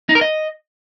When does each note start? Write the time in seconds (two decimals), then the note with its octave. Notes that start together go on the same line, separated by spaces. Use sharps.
0.09 D#4
0.15 A#4
0.21 D#5